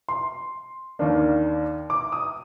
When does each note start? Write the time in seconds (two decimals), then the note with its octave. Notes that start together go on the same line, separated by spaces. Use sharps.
0.09 C6
0.99 D#2 D#3 A#3 D4
1.90 D6
2.12 D#6